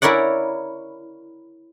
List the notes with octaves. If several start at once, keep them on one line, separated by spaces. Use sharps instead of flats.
E4 A#4 C#5 D5 F#5